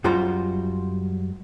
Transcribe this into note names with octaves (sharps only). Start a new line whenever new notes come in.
F#2 G3 F4 F#4 C5 A#5